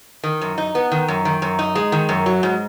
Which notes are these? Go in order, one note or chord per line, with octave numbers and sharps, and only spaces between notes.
D#3
F#2
D#4
B3
D#3
F#2
D#3
F#2
D#4
G#3
D#3
F#2
F#3
G#2